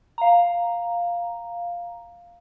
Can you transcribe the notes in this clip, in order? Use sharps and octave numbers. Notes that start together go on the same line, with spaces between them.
F5 A#5